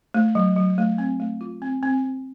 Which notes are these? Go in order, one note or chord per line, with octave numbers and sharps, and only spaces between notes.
A3
F#3
F#3
A3
C4
A3
F4
C4
C4
C4